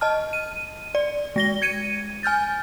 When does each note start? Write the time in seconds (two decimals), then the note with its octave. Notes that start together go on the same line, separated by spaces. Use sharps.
0.01 D#5 A5 F6
0.33 D#7
0.95 D5
1.36 G#3 A#6 G7
1.62 G#6 C#7 D#7
2.23 G#5 F6 G6 A6